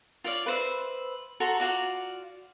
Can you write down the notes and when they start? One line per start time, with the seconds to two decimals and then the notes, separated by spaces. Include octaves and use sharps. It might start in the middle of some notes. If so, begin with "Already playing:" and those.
0.24 F4 C#5 D5 F5
0.46 B4 C5 E5
1.40 F#4 A4 A#5 C6
1.60 F4 F#4 D5